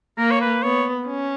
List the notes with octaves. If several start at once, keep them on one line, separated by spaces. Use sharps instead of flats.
A#3 A#4
C#5
B4
B3 C#5
C#4